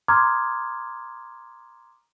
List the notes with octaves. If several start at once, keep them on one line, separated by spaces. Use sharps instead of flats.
A#5 C6 D6 D#6 F6 G#6